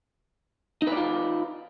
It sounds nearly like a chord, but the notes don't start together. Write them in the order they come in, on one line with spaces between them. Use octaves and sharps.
D#4 B4 D5 F4